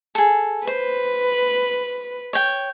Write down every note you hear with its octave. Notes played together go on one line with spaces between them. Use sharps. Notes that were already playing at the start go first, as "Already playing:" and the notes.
G#4 A4
B4 C5
C#5 G5